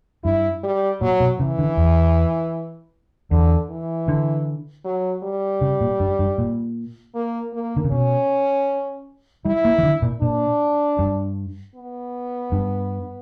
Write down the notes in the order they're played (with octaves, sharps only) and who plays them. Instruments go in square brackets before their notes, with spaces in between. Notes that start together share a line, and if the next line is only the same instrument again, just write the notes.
[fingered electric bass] G2 [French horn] E4
[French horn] G3
[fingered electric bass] A#2 [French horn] F#3
[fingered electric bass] B2
[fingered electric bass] C#3 [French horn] E3
[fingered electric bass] D3
E2
[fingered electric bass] E2 [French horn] D3
[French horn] E3
[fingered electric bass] D3
[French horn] F#3
G3
[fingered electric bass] C#3
A#2
G2
G2
A#2
[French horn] A#3
A#3
[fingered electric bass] D3
C#3
[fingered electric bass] B2 [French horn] C#4
[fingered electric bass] G3 [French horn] E4
[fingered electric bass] A#3
E3
D3
A#2
[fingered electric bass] A#2 [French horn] D4
[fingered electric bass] G2
[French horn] B3
[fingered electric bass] G2